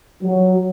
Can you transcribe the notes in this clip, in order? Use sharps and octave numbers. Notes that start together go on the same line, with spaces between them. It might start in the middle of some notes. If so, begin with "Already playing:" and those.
F#3